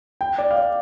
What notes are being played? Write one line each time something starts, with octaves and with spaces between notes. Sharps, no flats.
G5
D5
F5
D5